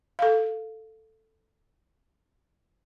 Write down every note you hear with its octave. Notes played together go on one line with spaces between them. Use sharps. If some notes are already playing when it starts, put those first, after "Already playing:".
A4 F5